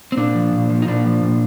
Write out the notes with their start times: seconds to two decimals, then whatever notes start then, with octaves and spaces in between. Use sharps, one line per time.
0.12 C4
0.17 A#2 D4
0.35 F3
0.53 A#2
0.70 F3
0.82 D#4
0.88 A#2 D4
1.05 F3
1.23 A#2